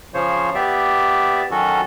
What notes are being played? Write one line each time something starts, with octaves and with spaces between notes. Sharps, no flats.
C#3 F3 C5 C#5
B3 G4 D5 E5
D#3 F#3 C#4 F#4 A4